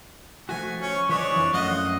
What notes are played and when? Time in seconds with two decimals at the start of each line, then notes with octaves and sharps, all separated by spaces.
0.49 F3 A3 F#4 G#5
0.81 C#4 C#6
1.09 F3 D4 B4 C#5 D#5
1.32 F2 E3
1.53 F#2 A3 F4 D#5 F#5